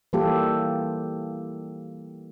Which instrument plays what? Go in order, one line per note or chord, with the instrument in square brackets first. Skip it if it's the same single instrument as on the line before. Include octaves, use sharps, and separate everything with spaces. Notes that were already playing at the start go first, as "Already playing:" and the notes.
[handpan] E3 G3 A#3 F4 G4 A4